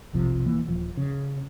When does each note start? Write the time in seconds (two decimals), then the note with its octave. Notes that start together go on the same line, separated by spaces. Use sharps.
0.13 F1 B1 C3 F3
0.46 D1 E3 A#3
0.68 D#1 F3
0.97 C#3